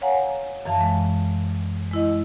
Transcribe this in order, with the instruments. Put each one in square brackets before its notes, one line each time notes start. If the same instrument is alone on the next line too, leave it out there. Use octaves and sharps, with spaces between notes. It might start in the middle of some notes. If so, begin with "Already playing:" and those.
[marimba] C#5 F5 F#5 G#5 A#5
F#2 E3 F5 A5
G#3
G#3 E4 D#5